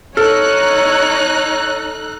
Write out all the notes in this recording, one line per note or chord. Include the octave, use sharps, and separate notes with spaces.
D#4 A4 C#5 F6 F#6